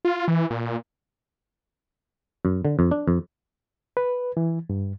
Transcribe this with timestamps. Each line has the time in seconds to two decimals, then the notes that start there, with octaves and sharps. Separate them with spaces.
0.05 F4
0.28 E3
0.50 A#2
2.45 F#2
2.65 D3
2.79 F2
2.91 D4
3.08 F2
3.97 B4
4.37 E3
4.70 G2